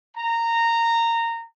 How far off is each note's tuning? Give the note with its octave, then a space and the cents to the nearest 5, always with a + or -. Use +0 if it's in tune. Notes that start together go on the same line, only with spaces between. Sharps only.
A#5 -15